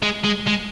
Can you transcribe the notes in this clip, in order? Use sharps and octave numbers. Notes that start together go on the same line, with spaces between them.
G#3
G#3
G#3